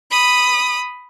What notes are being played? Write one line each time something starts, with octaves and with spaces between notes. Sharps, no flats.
B5 D#6